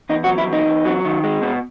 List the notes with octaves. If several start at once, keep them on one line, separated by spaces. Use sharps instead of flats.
E2 D#4
F#4
F#3
E4
E2
D#4
E2
F#3
D#3
G#3
B2